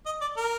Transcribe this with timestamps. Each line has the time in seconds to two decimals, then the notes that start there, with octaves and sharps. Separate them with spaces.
0.06 D#5
0.21 D5
0.37 A#4